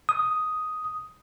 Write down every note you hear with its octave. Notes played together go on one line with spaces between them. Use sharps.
D#6